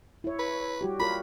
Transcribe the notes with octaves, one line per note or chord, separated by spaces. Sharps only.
E4 C#5
B4
G3 F#4 G4
F4 A#4 C#5 B5